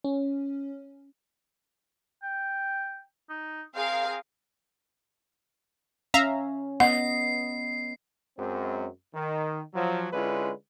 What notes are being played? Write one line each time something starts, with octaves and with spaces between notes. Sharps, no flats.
C#4
G5
D#4
C4 G#4 A#4 F5
C#4 E5 F5 A#5
B3 D#5 F#5 C7
F#2 G#3 C4
D#3
F3 F#3
D3 G#3 C#4 E4 F4 B4